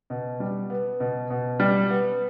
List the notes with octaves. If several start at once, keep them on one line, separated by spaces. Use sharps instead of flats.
B2
G3
B3
B2
B2
G3
B3